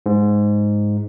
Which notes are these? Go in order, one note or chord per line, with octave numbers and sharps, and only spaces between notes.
G#2